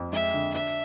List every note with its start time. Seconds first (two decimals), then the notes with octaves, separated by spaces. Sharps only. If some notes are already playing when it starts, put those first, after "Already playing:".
Already playing: F2
0.12 G#3 E5
0.34 D3
0.54 D4 E5